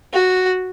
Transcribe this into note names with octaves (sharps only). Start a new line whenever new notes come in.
F#4